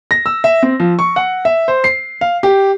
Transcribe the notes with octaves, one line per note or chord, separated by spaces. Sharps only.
A#6
E6
E5
C4
F3
C#6
F#5
E5
C5
C7
F5
G4